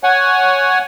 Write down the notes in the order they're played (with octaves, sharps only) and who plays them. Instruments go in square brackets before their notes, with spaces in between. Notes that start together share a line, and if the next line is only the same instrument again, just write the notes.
[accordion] C#5 F#5 G#5